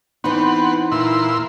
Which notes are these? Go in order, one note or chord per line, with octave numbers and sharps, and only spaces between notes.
E3 B3 C4 D#4 F#5
A#2 E4 C6